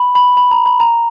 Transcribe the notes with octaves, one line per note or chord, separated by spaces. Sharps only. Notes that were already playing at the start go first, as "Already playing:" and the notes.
Already playing: B5
B5
B5
A#5
B5
A#5